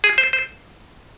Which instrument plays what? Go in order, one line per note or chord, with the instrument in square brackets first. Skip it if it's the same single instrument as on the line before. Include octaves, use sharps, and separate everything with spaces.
[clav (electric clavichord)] G#4
C5
C5